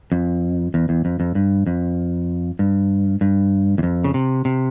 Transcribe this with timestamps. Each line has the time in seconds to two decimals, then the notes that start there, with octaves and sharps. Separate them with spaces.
0.12 F2
0.74 E2
0.89 E2
1.05 F2
1.20 F2
1.35 G2
1.66 F2
2.59 G2
3.21 G2
3.78 E2
3.83 F2
4.04 C#3
4.14 C3
4.45 C3